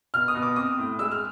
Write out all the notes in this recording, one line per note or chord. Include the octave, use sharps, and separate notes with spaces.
B2 F6
D#6
B2
D6
C4 D#6
A2
G#3 E6
F6